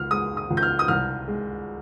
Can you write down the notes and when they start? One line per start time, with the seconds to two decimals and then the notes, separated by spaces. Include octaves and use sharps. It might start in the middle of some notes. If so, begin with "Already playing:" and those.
Already playing: C#2 F6
0.11 G#3 D#6
0.37 D#6
0.50 C#2
0.57 G6
0.63 F6
0.79 D#6
0.88 C2 F6
1.28 G#3